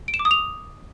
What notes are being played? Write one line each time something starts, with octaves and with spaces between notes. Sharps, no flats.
D7
E7
D6
D#6
F7